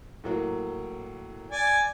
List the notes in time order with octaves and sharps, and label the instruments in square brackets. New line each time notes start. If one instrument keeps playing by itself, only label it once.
[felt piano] A2 F#3 A#3
[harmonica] D5 G#5